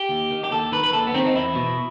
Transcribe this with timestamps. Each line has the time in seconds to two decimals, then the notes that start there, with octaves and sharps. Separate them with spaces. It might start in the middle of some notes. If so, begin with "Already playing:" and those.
Already playing: G4
0.09 D#2
0.31 D#3
0.44 G4
0.52 D#2 A4
0.72 D#3 B4
0.83 B4
0.92 D#2 A4
1.07 B3
1.14 D#3 C4
1.27 D#4
1.35 E2 E4
1.55 B2